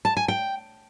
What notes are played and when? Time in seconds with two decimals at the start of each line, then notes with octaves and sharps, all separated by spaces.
0.05 A5
0.17 G#5
0.28 G5